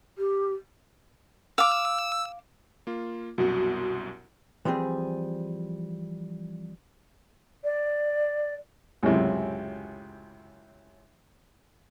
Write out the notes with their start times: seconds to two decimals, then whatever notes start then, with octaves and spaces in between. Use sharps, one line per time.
0.18 G4
1.58 F5 D6 E6
2.87 A#3 F4
3.38 C2 F#2 B2 F#4
4.65 E3 F3 G3 C4 G#4
7.64 D5
9.03 C#2 F#2 A2 C3